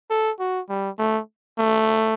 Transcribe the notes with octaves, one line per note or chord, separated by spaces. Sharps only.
A4
F#4
G3
A3
A3